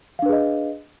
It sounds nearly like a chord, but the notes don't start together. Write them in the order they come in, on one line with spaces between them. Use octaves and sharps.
F5 D4 B4 G#4 D#5